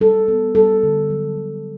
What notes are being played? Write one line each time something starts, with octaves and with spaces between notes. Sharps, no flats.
G3 A4
B3
G3 A4
D3
F#3
D3